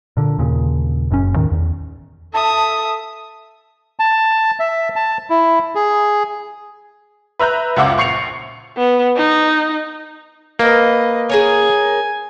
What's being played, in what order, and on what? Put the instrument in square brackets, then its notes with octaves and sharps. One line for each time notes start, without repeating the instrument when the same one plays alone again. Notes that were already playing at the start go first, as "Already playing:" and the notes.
[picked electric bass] A#2 D3
D#2 A#2 C#3
F#1 F#2 A#2 C#4
D#2 A2 D#3
E2
[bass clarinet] A4 [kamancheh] E5 D#6 [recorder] A5
[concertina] A5
E5
A5
E4
G#4
[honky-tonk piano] B4 E5 A#5 F#6 G6
C#2 F#2 F4 E5 F#5 D6
A#1 C#6 C7 C#7 F7
[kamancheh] B3
D#4
[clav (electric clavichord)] A#3 [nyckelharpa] B4 D#5
[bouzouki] G#4 A#4 C#5 [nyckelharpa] G#5